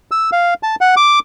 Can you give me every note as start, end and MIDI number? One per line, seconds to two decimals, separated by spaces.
0.11 0.30 88
0.32 0.54 77
0.63 0.75 81
0.81 0.95 78
0.97 1.19 86